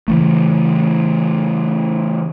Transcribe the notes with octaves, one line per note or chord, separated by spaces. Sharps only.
C#3 E3 A3